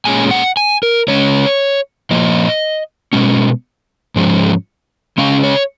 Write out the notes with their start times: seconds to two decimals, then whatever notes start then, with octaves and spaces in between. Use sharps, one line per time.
0.05 A#2 G#3 C#4 G#5
0.31 F#5
0.57 G#5
0.83 A#4
1.08 C#3 G#3 C#4 C#5
2.11 A#2 F3 A#3 D#5
3.13 B2 G#3 C#4
4.16 G#2 F3 G#3 C#4
5.18 C#3 G#3 C#4 F5
5.43 C#5